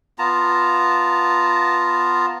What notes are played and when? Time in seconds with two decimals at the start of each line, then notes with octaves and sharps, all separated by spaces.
0.19 B3 F4 A5 A#5